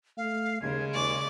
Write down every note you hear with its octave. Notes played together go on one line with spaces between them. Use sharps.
A3 F5
D#2 C#3 G#3 G#6
D#2 D5 C#6